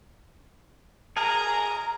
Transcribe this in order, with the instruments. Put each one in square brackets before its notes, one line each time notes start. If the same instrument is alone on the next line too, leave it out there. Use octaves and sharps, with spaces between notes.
[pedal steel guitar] G#4 A#4 [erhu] A#5